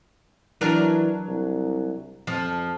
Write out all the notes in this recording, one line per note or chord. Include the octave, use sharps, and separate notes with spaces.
E3 F#3 D4 A#4
C2
F2 F3